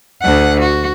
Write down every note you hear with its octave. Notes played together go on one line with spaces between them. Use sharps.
D2 F#5
F#4